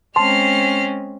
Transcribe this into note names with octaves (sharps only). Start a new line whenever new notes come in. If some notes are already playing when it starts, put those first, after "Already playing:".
G#3 C4 C#4 A5 C6 F6 C7